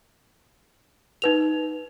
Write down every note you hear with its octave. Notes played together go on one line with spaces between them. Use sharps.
D#4 B4 F7